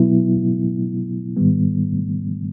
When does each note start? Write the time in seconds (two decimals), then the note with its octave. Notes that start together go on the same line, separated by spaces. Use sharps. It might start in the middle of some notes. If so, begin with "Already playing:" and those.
Already playing: B2 F#3 B3 E4
1.36 G#2 D#3 G3 B3